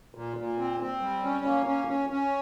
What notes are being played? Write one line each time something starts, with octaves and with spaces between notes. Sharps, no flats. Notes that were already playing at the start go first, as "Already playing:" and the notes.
A#2
A#2
C4
C4
G3
C#4
A#3
C#4
C#4
C#4